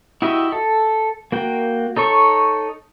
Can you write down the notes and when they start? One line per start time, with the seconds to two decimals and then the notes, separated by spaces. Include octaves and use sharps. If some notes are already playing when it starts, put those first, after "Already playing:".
0.22 E4 F#4 G4 D#5 E5
0.52 A4
1.32 A#3 F#4 G5
1.97 D#4 A4 C#5 C#6